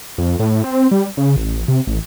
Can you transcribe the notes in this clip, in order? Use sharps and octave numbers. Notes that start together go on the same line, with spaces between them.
F2
A2
C4
G3
C#3
A1
C3
A1